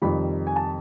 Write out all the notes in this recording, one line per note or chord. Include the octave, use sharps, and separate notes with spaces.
F2 C3 D#3 G3 B5
G#5
A5